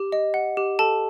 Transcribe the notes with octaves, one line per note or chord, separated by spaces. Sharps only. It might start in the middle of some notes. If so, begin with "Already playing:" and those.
Already playing: G4
D#5
F#5
G4
A4 A5